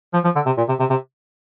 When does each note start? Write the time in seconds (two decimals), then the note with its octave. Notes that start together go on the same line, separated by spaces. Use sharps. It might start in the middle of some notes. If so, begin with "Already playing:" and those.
0.14 F3
0.24 F3
0.36 D3
0.46 C3
0.58 A#2
0.69 C3
0.80 C3
0.90 C3